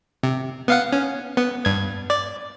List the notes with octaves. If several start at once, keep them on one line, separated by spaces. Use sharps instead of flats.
C3
B3 F5 F#5
C#4
B3
G2 G#6
D5